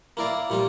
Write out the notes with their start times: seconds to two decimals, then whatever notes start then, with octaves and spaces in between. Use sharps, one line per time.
0.17 A#3 E4 A#4 D5 F5
0.50 A#2 G3 A#3 F4